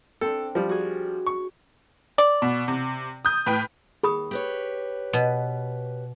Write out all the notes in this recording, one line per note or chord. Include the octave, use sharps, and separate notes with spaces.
C4 D4 A4
F3 G3
F#4 G#4
C#6
D5
B2
C3
D#6 G6
A2 B4 G5
D#2 G#4 B5 D#6
G4 B4 C#5
B2